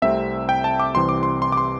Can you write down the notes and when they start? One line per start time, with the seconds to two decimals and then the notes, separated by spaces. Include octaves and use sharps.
0.02 C2 C3 A3 C4 E5
0.49 G5
0.64 A5
0.80 D6
0.95 C2 C3 E3 C4 C6
1.09 D6
1.23 C6
1.42 C6
1.52 D6
1.57 C6